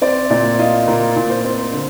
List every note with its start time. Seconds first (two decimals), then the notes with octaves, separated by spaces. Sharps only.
0.02 C4 D5
0.30 A#2 D5
0.59 F4 D#5
0.87 A#2 A#4
1.16 A#2
1.30 C5
1.44 C4
1.73 D3